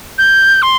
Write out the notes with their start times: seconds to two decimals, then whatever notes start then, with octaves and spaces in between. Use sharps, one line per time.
0.18 G6
0.62 C6